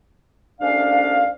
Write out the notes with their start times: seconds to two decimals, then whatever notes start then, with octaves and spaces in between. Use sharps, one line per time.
0.61 C2 A3 C#4 D4 D5 F5